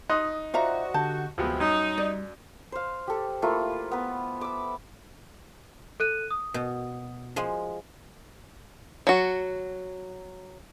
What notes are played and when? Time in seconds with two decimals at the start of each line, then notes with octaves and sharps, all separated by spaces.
0.10 D#4 C6 D#6 F#6
0.54 F4 F#4 C5 D5 E5 A#5
0.94 D3 G4 A5 G6
1.38 D2 G#2 C3 F3 F#3 G#3 B3 G5
1.60 F#2 G3 D#4 C#5
1.98 G3 D5
2.72 C5 F5
3.07 G4 A4
3.42 A3 A#3 E4 F4
3.92 B3 B4
4.41 D6 E6
6.00 A4 F#6 D#7
6.31 D#6
6.54 B2
7.36 F3 G#3
9.07 F#3 F#4